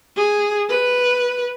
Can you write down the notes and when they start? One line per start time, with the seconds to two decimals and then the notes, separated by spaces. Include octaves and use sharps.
0.17 G#4
0.70 B4